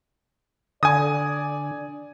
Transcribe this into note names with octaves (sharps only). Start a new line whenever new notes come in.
D3 D5 G#5 D#6